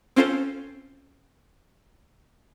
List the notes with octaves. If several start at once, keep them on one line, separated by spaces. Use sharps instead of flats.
C4 C#4 F4 A4 C5